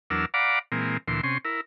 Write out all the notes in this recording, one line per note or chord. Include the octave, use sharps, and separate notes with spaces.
E2 F#3 D4 A#4 E6 F6
D5 F5 F#5 A#5 B5 D6
A#2 E3 G#3 A#3 C4
D2 A#2 E3 C6
C3 C#4 C6
E4 A#4